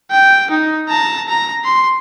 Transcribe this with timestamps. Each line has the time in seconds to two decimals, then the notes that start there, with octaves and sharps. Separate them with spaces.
0.11 G5
0.51 D#4
0.89 A5 A#5
1.28 A#5
1.64 C6